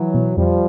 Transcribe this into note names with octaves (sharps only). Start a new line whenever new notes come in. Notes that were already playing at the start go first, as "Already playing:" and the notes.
Already playing: E3 F#3
B2
F2 F3 G3